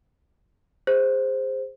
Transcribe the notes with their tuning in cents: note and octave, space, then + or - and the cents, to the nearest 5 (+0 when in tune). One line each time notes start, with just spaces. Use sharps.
G#4 -25 C5 +0